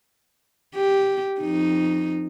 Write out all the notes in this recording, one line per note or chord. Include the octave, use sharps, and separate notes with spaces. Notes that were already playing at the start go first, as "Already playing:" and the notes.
G4
F2 D#4